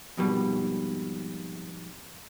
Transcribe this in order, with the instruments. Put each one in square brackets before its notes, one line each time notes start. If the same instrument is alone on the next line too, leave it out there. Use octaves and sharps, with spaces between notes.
[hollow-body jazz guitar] F2 G#2 B2 G3